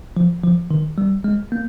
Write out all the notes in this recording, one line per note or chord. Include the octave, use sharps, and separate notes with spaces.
F3
F3
D#3
G3
G#3
A#3